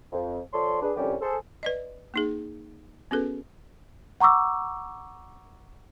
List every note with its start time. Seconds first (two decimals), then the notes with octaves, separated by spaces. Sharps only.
0.13 F2
0.53 F3 A4 C#5 D5 C6
0.82 D4 G#4 B4
0.96 C2 F2 D3 G3 C#4 G4
1.22 G#4 A4 C5
1.63 B4 D5 D#5
2.14 A#3 D#4 G#4
3.11 B3 C#4 F#4 G#4 A4 B4
4.20 F#5 A#5 C#6 D6 E6